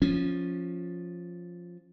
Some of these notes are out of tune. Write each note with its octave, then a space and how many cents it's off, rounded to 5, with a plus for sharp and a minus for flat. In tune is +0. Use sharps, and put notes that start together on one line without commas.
F3 +5 C#4 +0